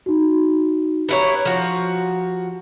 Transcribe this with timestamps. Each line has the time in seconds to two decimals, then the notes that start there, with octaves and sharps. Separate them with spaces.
0.06 D#4 F#4
1.09 B3 E4 G4 C#5 A#5
1.45 F3 F#4